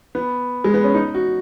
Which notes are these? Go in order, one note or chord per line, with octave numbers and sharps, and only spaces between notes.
B3
G#3
B3
C#4
D#4
F#4